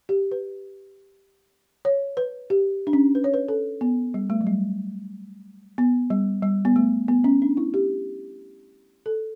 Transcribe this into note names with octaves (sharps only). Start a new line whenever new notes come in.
G4
B4
C#5
B4
G4
D4
C#4
B4
C#5
B4
A4
B3
G3
A3
F#3
G3
B3
G3
G3
B3
A3
B3
C#4
D4
E4
G4
A4